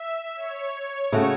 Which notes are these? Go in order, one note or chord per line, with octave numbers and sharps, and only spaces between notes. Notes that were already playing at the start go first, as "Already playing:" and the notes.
Already playing: E5
C#5
C#3 A3 F#4